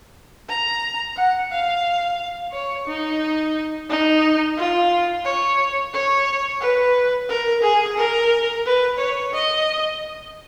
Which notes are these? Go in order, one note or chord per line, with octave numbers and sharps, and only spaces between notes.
A#5
F#5
F5
C#5
D#4
D#4
F4
C#5
C#5
B4
A#4
G#4
A#4
B4
C#5
D#5